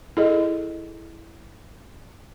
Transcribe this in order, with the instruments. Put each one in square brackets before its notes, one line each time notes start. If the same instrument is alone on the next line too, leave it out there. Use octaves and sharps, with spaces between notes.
[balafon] E4 G#4 A4 D#5